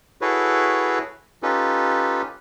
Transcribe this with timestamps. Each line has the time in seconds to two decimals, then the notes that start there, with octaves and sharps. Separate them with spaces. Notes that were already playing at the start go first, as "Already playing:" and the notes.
0.21 E4 F#4 G#4 A4 B4 C#5
1.43 C#4 D#4 F4 G4 A4 B4